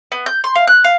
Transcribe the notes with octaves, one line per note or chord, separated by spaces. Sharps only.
B3
G6
C6
F5
F#6
F5